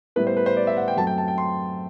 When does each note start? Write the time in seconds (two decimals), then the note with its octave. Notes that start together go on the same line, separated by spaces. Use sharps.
0.16 A2 G3 B3 E4 B4
0.27 C5
0.37 B4
0.46 C5
0.57 D5
0.67 E5
0.77 F#5
0.88 G5
0.97 F#2 F#3 A3 C4 A5
1.07 G5
1.18 A5
1.28 G5
1.38 C6